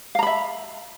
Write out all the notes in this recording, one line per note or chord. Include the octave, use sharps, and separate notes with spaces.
E5 F5 A#5 B5